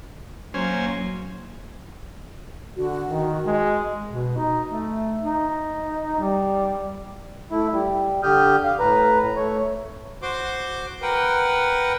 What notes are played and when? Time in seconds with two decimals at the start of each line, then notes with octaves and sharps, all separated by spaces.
0.54 F#3 A#3 C#4 C5 G#5
2.77 D3 F#4
3.10 D#3
3.45 G#3
4.10 B2
4.37 D#4
4.68 A3
5.23 D#4
6.20 G3
7.52 A3 E4
7.72 G3
8.23 D3 G4 D#6 F6 G6
8.64 F5
8.80 A2 B4 A#5
9.36 A3 C#5
10.22 F#4 C5 C6 D6
11.02 A#4 B4 F#5 G5